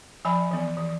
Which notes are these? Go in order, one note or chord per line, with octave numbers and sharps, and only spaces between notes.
F3 D5 G#5 B5
E3 B3
E3